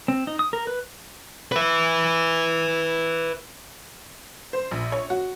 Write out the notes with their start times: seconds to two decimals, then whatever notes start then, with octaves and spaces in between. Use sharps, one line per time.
0.08 C4
0.27 D#4
0.39 D#6
0.53 A#4
0.67 B4
1.52 B4 E5
4.53 C5
4.71 A#1
4.92 C#5
5.10 F#4